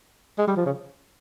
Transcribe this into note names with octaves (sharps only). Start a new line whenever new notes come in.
G#3
G3
F3
C#3